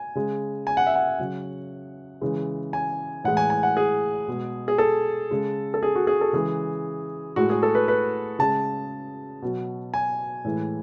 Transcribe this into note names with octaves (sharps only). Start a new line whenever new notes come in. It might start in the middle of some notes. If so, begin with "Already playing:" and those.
Already playing: G#5
C#3 G#3
G#5
F#5
E5
F#5
C#3 F#3
C#3 E3 G#3
G#5
A2 E3 G#3 F#5
G#5
G#5
F#5
G#4
B2 G#3
G#4
A4
C#3 G#3
A4
G#4
F#4
G#4
A4
C#3 E3 G#3 G#4
A2 G#3 F#4
G#4
A4
B4
B4
C#3 G#3 A5
B2 F#3
G#5
A2 E3 G#3